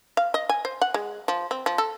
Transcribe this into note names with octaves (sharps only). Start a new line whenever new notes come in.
F5
D#5
G#5
C5
F#5
G#3
F3
C4
F3
A4